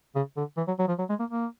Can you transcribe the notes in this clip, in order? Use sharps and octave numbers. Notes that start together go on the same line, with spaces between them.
C#3
D3
E3
F#3
F#3
F3
F#3
G#3
A#3
A#3